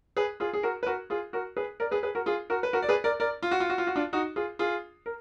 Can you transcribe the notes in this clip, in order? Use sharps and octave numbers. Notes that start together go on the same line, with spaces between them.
G#4 B4
F4 G#4
G#4
F#4 A#4
B4
F#4 A#4
F4 G#4
F#4 A#4
G#4 B4
A#4 D5
G#4 B4
G#4 B4
F#4 A#4
F4 G#4
F#4 A#4
B4
F#4 A#4
D5
G#4 B4
A#4 D5
A#4 D5
F4
F#4
F4
F#4
F4
F#4
D4 F4
D#4 F#4
F4 G#4
F4 G#4
A#4